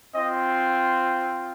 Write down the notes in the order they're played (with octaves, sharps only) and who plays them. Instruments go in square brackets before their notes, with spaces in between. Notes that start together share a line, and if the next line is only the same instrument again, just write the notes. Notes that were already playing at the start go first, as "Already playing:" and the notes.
[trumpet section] C4 F4 D#5